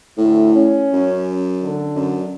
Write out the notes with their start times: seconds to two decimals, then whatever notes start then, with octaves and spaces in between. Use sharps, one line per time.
0.18 D2 A2
0.54 C#4
0.93 F#2
1.63 D3
1.95 F#2